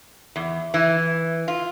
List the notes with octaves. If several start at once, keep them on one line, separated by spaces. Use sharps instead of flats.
E2
E3
F4